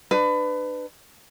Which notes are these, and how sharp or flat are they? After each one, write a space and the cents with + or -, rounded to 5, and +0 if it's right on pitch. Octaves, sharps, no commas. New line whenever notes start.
D4 +35 B4 +25